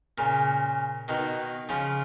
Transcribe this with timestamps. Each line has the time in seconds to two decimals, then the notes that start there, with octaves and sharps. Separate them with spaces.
0.18 A#2 C#3
1.08 B2 D#3
1.69 C#3 F3